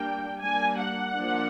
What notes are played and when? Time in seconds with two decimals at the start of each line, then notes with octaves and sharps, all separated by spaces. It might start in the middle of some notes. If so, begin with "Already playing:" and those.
Already playing: G3 A#3 D4 G5
0.42 G3 A#3 D4 G#5
0.78 F#5
1.15 F3 A#3 D4